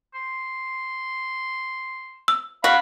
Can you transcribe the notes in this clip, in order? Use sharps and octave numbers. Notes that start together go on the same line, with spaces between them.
C6
E6
F#4 F5 B5